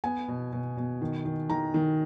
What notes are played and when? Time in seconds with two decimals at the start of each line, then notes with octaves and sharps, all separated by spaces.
0.04 B3 G#5
0.28 B2
0.53 B2
0.77 B2
1.01 D#3
1.25 D#3
1.50 D#3 A#5
1.74 D#3